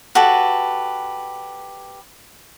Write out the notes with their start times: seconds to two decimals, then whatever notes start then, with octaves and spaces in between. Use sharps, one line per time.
0.15 F#4 G4 A4 B4